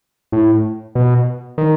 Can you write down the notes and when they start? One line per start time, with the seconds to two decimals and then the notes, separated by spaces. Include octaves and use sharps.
0.32 A2
0.95 B2
1.58 D#3